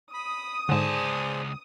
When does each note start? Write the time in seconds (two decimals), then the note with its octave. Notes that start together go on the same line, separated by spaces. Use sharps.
0.14 B5 D#6
0.69 C#2 G#2 D3 G#4 C5 D5 A5